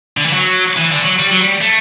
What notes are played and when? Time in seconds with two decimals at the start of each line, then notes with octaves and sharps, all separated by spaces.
0.17 D3
0.26 E3
0.33 F#3
0.76 E3
0.91 D3
1.04 F#3
1.19 G3
1.30 F#3
1.40 G3
1.61 A3